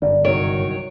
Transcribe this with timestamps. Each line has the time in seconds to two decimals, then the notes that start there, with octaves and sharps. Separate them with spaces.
0.02 G1 F#2 D5
0.25 C2 D#3 F#3 C#5 D7